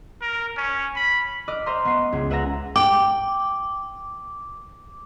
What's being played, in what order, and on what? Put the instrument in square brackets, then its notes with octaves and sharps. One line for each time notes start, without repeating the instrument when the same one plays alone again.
[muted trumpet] A#4
C#4
B5
[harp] D#5 D6 F6 F#6
C5 D#5 E5 A#5 C6 F6
B3 C#6 C7
C#2
B4 E5 F#5 A#5 A#6
[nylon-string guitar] G5 [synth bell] D6